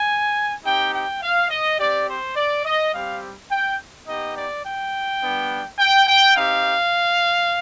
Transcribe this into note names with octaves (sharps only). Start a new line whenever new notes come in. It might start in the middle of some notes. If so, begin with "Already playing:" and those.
Already playing: G#5
C4 D#4 G4 G5
G5
F5
D#5
C4 G4 D5
C5
D5
D#5
G3 C4 G4 F5
G5
B3 D#4 G4 D#5
D5
G5
G3 B3 D4
G5
G5
C4 D#4 G4 F5